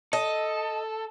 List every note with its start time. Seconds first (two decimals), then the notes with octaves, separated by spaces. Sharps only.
0.13 A4 D#5